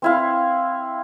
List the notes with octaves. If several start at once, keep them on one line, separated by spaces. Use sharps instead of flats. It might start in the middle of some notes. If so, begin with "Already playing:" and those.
C4 E4 F5